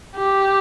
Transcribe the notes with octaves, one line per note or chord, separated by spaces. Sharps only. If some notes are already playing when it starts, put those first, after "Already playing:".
G4